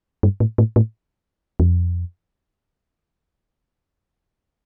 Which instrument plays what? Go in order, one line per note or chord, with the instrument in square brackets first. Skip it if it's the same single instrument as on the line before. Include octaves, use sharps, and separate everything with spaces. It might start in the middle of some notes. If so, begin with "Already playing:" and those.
[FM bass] G2
A2
A2
A2
E2
F2